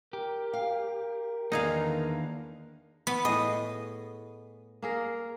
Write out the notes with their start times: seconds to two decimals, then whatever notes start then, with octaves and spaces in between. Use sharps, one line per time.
0.13 G4 A#4
0.53 F5
1.52 E2 D3 D#3 A#3 D#4 G#4 F5
3.07 B3
3.25 A2 G#4 D#5
4.82 A#3 G#4 A#4